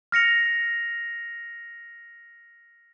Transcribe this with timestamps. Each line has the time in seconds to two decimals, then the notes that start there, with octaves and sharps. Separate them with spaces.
0.12 F6 A#6 C#7 F7